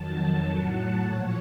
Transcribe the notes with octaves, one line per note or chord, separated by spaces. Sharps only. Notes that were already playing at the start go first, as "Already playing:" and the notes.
Already playing: F2 D#3 F#3 A5
A5
A2 F#3 F#5
A5
A#2 F3 C#5